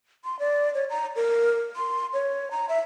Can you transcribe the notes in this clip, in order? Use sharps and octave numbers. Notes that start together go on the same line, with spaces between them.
C6
D5
C#5
A#5
A#4
C6
C#5
A#5
E5